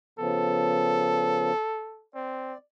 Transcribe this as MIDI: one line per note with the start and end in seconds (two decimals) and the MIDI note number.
0.19 1.52 49
0.19 1.52 53
0.19 1.52 59
0.19 2.05 69
2.15 2.54 60
2.15 2.58 74